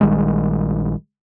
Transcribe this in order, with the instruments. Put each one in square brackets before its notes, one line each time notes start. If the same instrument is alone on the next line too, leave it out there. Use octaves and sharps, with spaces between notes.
[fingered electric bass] A#1 D#3 G3 G#3